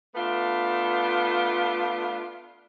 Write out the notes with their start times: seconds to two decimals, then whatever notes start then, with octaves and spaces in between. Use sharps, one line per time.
0.15 A3 B3 D4 F4